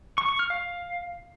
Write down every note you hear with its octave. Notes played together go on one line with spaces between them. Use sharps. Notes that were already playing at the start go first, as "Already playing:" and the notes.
C#6
C#6
F6
F5